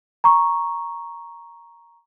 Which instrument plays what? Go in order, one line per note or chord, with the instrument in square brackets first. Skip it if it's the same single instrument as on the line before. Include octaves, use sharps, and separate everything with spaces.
[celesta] A#5 C#6